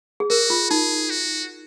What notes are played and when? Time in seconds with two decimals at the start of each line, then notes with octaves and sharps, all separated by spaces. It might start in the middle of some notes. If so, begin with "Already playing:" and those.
0.20 G#4
0.30 F#4 A#4
0.50 F4
0.70 D#4 G#4
1.10 F#4